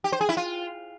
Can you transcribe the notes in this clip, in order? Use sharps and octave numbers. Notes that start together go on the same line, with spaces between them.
G4
C5
G#4
E4
F4